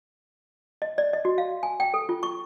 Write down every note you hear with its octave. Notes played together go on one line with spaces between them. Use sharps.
D#5
D5
D#5
F#4
F5
G#5
G5
A4
F4
C#6